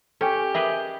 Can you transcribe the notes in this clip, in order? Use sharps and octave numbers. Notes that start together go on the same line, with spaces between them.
C#4 G4 A4 G5
G#4 A#4 B4 D#5 E5 D6